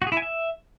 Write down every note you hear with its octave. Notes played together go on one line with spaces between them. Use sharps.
F#4
G#4
E4
G#5
E5